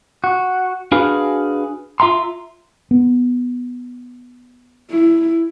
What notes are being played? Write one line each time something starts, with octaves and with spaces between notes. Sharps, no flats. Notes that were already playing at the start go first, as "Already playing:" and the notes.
F#4
D4 F#4 G#4 B4 F5
F4 E5 A#5 C6
B3
E4